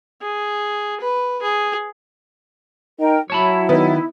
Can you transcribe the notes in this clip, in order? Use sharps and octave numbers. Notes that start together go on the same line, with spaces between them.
G#4
B4
G#4
D#4 A#4 G5
F#3 E4 C#5 A5 B5
D#3 B3 D#4